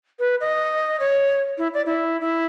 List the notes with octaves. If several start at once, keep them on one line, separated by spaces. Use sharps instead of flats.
B4
D#5
C#5
E4
D5
E4
E4